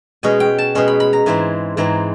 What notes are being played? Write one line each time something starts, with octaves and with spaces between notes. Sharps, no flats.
B2 G#3 C#4 G#5
G5
A5
B2 G#3 C#4 C6
B5
B5
A#5
G#2 E3 G#3 C4 G#5
G#2 E3 G#3 C4 A#5